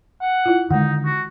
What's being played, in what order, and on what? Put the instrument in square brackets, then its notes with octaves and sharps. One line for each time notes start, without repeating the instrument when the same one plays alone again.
[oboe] F#5
[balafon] E4 F4
[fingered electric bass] D3 D#3 [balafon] G#3 F#5 [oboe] D#4
[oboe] F#4